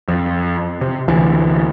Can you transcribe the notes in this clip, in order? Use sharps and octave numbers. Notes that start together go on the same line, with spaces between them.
F2
C3
D2 C3 E3